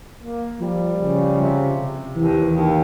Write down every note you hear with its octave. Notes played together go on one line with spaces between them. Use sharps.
A#3
F3 G3
C#3
C3
C3
D#2 E3
D#2